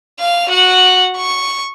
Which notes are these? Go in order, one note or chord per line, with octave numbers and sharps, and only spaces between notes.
F5 F7
F#4 F#5
C#6